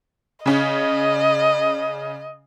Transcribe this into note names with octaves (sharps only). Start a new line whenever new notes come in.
C#3 C#4 D#5